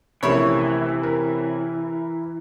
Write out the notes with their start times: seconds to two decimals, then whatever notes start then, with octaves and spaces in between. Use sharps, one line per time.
0.23 A#1 C3 E3 A3 A#3 C#4 E4 C#5
1.03 A#4